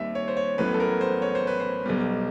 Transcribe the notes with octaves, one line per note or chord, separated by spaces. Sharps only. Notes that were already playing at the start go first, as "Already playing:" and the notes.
Already playing: D#2 D#3 G3 C4 E5
C#5
C5
C#5
A1 A2 F#3 B3 B4
A4
A#4
C5
C#5
C5
B4
C5
B1 B2 G3